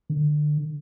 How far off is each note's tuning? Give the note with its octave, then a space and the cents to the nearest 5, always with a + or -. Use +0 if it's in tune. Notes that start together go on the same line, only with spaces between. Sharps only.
D3 +25